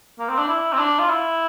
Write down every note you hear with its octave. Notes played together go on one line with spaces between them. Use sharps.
A#3
C4
D4
E4
C4
D4
F4
E4